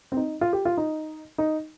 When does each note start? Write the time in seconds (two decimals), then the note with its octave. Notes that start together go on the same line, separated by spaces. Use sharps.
0.12 C4
0.17 D#4
0.41 F4
0.53 G4
0.65 F4
0.77 D#4
1.38 D#4